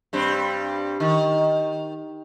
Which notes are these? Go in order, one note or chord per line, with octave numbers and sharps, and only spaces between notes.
G2 G3 C4
D#3